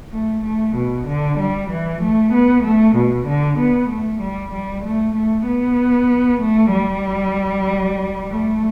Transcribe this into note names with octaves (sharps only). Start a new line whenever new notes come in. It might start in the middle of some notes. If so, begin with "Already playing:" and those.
A3
A3
B2
D3
G3
E3
A3
B3
A3
B2
D3
B3
A3
G3
G3
A3
A3
B3
A3
G3
A3